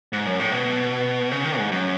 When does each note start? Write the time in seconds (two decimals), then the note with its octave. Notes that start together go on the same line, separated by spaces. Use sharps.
0.13 G#2
0.26 F#2
0.40 A2
0.52 B2
1.31 C#3
1.44 D#3
1.58 G#2
1.71 F#2